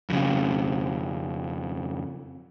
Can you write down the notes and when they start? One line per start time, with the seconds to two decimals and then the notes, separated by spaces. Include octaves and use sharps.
0.10 F2 C#3